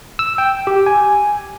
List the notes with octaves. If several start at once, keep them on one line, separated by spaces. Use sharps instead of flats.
E6
G5
G4
G#5